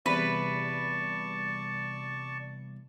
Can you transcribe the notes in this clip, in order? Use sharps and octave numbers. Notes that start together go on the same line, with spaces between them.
E2 C3 G3 B4 D5 A5 C#6